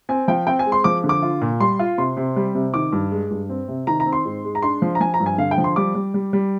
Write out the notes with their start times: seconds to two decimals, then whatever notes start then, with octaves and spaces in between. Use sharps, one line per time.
0.09 C4 G#5
0.28 F3 G5
0.47 C4 G5
0.59 G#5
0.66 G#3
0.72 C6
0.84 F3 D6
1.04 D3
1.09 D6
1.22 F4
1.41 A#2
1.60 G3 C6
1.79 F4
1.98 C3 C6
2.17 C3
2.36 G3
2.55 C3
2.74 D#3 D6
2.92 G2
3.12 G#3
3.31 G2
3.50 C4
3.68 C3
3.87 D#3 A#5
4.00 A#5
4.06 C4
4.13 C6
4.25 G#2
4.44 G#3
4.55 A#5
4.62 D4 C6
4.82 F3
4.95 A#5
5.00 F3 G#5
5.14 A#5
5.20 G2
5.26 G#5
5.38 D3 F5
5.51 G5
5.58 F3
5.64 C6
5.76 G3 D6
5.95 G3
6.14 G3
6.33 G3